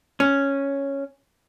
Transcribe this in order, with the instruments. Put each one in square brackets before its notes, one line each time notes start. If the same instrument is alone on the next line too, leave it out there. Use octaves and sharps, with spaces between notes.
[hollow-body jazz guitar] C#4